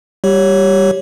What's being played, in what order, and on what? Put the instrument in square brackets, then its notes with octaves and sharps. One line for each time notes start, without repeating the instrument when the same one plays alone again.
[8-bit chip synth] G3 G4 C#5